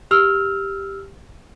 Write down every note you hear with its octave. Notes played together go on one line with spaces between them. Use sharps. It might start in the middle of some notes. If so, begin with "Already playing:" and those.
G4 E6 F6 F7